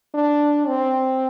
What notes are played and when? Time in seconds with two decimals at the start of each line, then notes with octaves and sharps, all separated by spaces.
0.14 D4
0.67 C4